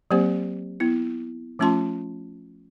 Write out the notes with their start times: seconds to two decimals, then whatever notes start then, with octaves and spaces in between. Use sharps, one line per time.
0.11 F#3 A#3 C4 G4 C5
0.80 B3 E4
1.59 F3 A3 C#4 F4 A5 C6